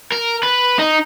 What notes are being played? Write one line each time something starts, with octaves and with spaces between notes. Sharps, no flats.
A#4
B4
D#4